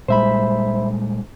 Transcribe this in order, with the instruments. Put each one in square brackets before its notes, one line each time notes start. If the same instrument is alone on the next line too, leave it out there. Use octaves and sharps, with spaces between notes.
[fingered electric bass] A#2 G3 G#3 [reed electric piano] C5 E5 B5